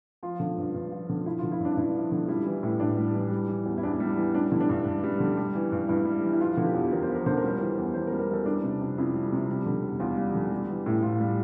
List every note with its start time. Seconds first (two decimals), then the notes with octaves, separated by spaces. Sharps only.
0.23 F3 F4
0.40 D3
0.58 G2
0.74 G2
0.92 F3
1.09 D3
1.26 F3 E4
1.39 F4
1.43 D3
1.52 E4
1.60 G2 D4
1.72 D4
1.77 G2 E4
1.95 F3
2.12 D3
2.28 G3 E4
2.46 E3
2.63 A2
2.80 A2 D4
2.97 G3
3.15 E3
3.31 G3
3.48 E3
3.66 E2
3.78 E4
3.83 E2 D4
4.00 G3
4.17 E3
4.34 G3 D4
4.52 D3 E4
4.60 D4
4.69 G2
4.85 G2
5.04 G3
5.20 D3
5.37 G3
5.55 E3
5.72 G2
5.88 G2 E4
6.05 G3
6.23 E3
6.33 E4
6.40 F3 F4
6.56 D3 F4
6.66 G4
6.74 E2
6.92 E2 A#4
7.02 C5
7.09 F3
7.15 A#4
7.26 D3 C5
7.37 A#4
7.43 G3 C5
7.60 E3 A#4
7.78 E2
7.94 E2 C5
8.07 A#4
8.12 G3
8.20 A#4
8.29 E3 A4
8.46 G3 D4
8.63 C3
8.81 F2
8.98 F2 E4
9.14 G3
9.32 C3
9.48 G3
9.66 D3
9.84 E2
10.00 E2 F4
10.17 G3
10.35 D3
10.52 G3
10.69 E3
10.86 A2
11.02 A2 F4
11.20 G3